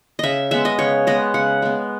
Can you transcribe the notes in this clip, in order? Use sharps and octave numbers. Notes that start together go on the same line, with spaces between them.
C#3 D#5 E5
G#3 B3 E5
D#5
C#3 C#5
G#3 B3 D#5
C#3 F#5
G#3 B3